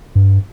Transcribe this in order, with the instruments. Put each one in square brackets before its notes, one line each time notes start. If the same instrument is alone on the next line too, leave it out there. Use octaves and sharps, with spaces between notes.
[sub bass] G2